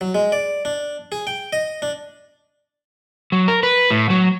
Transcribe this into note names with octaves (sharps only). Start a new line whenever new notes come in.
F#3
G#3
D5
D4
G#4
G5
D#5
D4
F#3
A#4
B4
A2
F#3